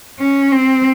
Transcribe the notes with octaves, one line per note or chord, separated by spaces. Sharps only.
C#4
C4